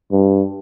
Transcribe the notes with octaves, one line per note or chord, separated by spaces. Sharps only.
G2